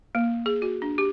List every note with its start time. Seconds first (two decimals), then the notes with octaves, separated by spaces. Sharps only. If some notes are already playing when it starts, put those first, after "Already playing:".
0.15 A#3
0.46 G#4
0.62 F#4
0.82 D4
0.98 G4